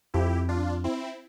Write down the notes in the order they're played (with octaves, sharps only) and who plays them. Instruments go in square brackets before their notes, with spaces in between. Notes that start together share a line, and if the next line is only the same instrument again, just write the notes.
[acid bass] F2 [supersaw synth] E4 G4
[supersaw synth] D4 F4
C4 E4